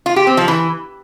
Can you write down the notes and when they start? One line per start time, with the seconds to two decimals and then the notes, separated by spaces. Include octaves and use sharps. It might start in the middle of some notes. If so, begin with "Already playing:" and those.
0.06 F4
0.16 G4
0.27 C4
0.37 F3
0.48 E3